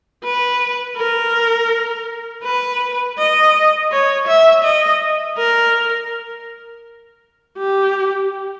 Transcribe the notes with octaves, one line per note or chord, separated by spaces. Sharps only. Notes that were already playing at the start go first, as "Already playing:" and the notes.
B4
A#4
B4
D#5
C#5
E5
D#5
A#4
G4